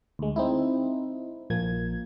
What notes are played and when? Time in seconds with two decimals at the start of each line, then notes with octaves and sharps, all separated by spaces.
0.19 D2 G#3
0.36 C4 D#4 E4
1.50 A#1 F3 A#3 G#6